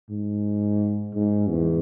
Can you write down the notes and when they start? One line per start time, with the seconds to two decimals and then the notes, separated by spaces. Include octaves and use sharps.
0.10 G#2
1.14 G#2
1.49 E2